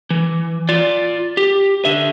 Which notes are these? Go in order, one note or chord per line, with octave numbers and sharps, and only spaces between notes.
E3
F4 D5
G4
D3 E5